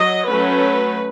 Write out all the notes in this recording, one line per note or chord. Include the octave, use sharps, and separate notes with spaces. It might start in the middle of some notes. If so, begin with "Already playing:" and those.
Already playing: F#3 D#5
F#3 A3 C#4 B4